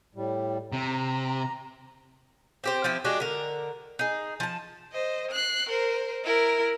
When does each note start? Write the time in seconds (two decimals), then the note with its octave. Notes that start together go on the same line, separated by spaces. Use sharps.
0.15 A2 G3
0.73 C3 A#5
2.64 C4 G4 C5
2.84 F3 C4 E4 G4
3.04 G#3 D4 F#4 G4
3.20 D3 A#4
3.99 D#4 G#4
4.40 F3 A5
4.93 C5 D#5
5.31 F#6 C7
5.69 A#4 C5
6.24 E4 A#4